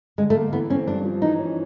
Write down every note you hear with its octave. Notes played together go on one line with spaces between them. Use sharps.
D3 G#3
A3
A#3
E3 B3
C4 C#4
G2 D4
F3
E3 D#4
C#4